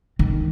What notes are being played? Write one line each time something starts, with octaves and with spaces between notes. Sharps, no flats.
D#3